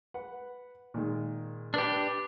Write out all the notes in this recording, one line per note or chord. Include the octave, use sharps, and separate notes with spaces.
B4 F#5
A#2 D#3 G#3
D4 G4 B4 D6